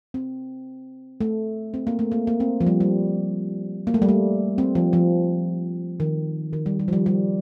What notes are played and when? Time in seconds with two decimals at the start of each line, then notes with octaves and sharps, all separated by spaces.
0.14 C4
1.21 A3
1.74 C4
1.87 A#3
1.99 A3
2.12 A#3
2.27 A#3
2.40 C4
2.61 F3
2.66 G3
2.80 G3
3.87 A#3
3.94 A3
4.02 G3
4.09 A3
4.58 C4
4.75 F3
4.93 F3
6.00 D#3
6.53 D#3
6.66 G3
6.79 G3
6.88 F3
6.93 G3
7.06 G3